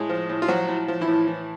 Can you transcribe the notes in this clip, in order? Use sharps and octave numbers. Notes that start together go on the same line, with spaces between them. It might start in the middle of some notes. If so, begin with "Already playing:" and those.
Already playing: A2 G#3 G#4
F3
A2
F4
F3 F#3 F#4
A2
F3
E3 E4
A2
E3